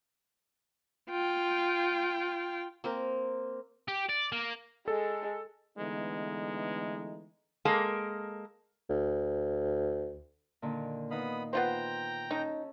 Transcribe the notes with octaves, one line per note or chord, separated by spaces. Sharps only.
F4 G5
A#3 C4 A#4
G4
D5
A#3
G#3 A4
D3 E3 G#3 A3 B3 D#4
G#3 A#3 A4 A#4
D2
A#2 D3 D#3
B3 D#4 F5 B5 D#6
B3 F4 C5 G5 A#5
C#4 D#4 A4